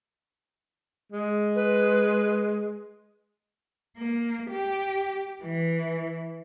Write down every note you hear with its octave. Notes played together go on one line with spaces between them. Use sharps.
G#3
B4
A#3
G4
E3